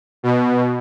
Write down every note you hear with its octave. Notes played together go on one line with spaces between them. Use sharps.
B2